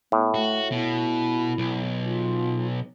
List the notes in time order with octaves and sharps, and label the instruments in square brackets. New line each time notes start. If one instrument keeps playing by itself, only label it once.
[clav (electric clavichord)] A2 [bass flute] B3
[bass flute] A3 [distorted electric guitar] F#4
[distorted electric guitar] B2 [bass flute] E4
[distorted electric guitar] B1
[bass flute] F4